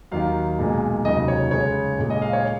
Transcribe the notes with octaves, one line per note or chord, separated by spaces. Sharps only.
D#2 D#3 F#3 F5
B1 A#2 G#3
F1 D#2 C#3 F#3 D#5
C#5
C#2 C#3 G#3 C#5
A#1 A#2 G#3
D#5
F5
C#5